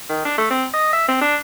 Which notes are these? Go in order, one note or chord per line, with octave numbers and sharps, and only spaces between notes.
D#3
D4
A3
C4
D#5
E5
C4
D4